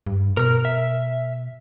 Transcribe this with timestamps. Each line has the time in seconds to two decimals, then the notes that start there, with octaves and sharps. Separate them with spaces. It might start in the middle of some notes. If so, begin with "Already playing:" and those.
0.07 G2
0.37 B2 A#4 F6
0.65 E5